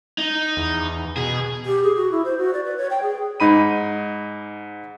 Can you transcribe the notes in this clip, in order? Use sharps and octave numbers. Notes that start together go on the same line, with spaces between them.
D#4
E2
B2 G#4
G4
G#4
F#4
E4
C5
F#4
D5
B4
C#5
G5
G#4
G#2 D#4 B5 D#7